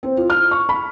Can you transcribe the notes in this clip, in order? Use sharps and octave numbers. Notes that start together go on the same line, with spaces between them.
C4
F4
F6
C#6
B5